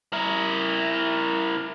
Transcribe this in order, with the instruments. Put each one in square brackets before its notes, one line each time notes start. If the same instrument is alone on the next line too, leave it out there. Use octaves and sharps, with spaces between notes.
[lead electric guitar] E4 A#4